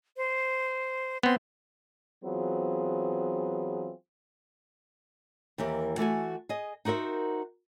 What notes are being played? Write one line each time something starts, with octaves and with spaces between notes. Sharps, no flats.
C5
B3 C4 C6
E3 F#3 B3 C4 F4 G#4
D#2 E3 G4 A#4
E3 A3 F#4 G#5
G#4 D#5
D#4 F#4 A#4 C5 E5